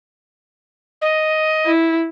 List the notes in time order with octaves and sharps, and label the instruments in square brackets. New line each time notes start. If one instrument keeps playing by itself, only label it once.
[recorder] D#5
[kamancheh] E4